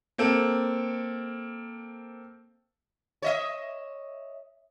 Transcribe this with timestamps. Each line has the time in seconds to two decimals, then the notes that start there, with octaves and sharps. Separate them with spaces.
0.18 A#3 C4 A4
3.22 C#5 D#5 E5